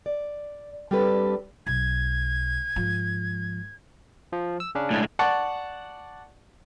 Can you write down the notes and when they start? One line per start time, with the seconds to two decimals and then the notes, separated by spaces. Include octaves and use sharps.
0.06 D5
0.91 G3 C4 D4 G4 A4 B4
1.67 B1 G#6
2.76 G#2 F3
4.33 F3
4.60 E6
4.75 C#3 C#4 D4
4.91 A2 G#3 A3
5.19 D5 F#5 A5 C#6